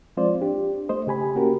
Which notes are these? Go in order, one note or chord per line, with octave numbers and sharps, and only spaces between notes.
F3 G#3 C4 F4 C5 D5
D4 G4
A3 C5 D#5
C#3 G4 G#5 B5
A#3 C#4 F#4 G4 A#4